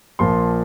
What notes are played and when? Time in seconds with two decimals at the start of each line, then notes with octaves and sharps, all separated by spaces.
0.19 A#1 A#2 F3 C6